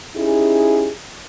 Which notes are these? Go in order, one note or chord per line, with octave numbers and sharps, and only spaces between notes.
C#4 D#4 E4 G4 G#4